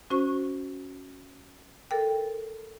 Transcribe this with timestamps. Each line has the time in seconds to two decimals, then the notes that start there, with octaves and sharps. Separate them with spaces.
0.10 C#4 F#4 C5 C#6
1.91 A4 A#4 G5